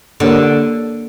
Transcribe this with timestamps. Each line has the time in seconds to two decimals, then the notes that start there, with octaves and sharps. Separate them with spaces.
0.20 D3 A#3 D4 G4 A#4 C#5